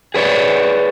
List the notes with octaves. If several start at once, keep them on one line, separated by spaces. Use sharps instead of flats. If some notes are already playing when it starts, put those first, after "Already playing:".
G#4 B4 C#5 D5